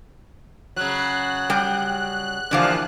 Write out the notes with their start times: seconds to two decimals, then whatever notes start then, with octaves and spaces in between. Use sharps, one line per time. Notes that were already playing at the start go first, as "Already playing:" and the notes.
0.76 C#3 F#3 F#6
1.50 G3 G5
2.51 G2 A#2 D3 E3 F3 F5